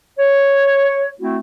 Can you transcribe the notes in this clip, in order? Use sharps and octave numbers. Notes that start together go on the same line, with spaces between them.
C#5
A3 C4 E4 F#4